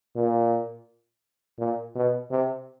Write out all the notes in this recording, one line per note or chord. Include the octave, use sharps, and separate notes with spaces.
A#2
A#2
B2
C3